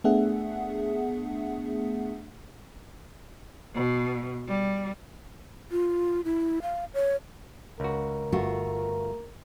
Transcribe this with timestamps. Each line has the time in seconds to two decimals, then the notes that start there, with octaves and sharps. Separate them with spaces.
0.04 A3 B3 D4 G#4 E5 F#5
3.74 B2
4.46 G3
5.71 F4
6.25 E4
6.62 F5
6.94 C#5
7.80 C#2 F#4 A#4
8.32 G1 A3 F4 F#4